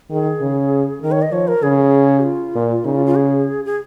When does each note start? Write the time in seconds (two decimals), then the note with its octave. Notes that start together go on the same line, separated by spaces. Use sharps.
0.10 D#3 G#4
0.41 C#3
1.02 D#3 A#4
1.12 C#5
1.22 D#5
1.32 F3 C#5
1.48 A#4
1.63 C#3 G#4
2.24 F4
2.55 A#2
2.85 C#3 D#4
2.96 F4
3.06 F4
3.16 G#4
3.65 G#4